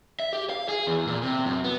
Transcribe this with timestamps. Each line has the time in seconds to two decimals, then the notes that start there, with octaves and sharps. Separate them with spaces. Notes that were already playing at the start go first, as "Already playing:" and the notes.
0.20 E5
0.33 G4
0.50 F5
0.69 G#4
0.87 E2
1.07 A#2
1.23 C3
1.46 F#2
1.64 B3